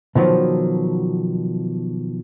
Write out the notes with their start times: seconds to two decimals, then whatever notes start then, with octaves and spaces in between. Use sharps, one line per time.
0.15 B2 D#3 F3 F#3